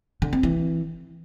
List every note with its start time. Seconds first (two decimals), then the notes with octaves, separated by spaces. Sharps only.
0.22 D3
0.33 C4
0.43 E3